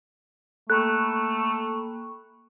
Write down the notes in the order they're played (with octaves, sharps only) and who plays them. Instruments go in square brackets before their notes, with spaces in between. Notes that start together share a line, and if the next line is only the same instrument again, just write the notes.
[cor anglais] A3 [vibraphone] A#3 G5 [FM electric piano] A4 B5 C#6 [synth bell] F#6